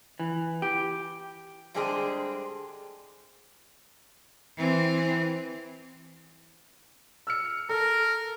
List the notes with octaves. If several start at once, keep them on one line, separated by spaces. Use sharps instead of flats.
E3
G4
D3 G3 G#3 C4 D4 G#4
E3 C4
E6 F6 C#7
A4 A#4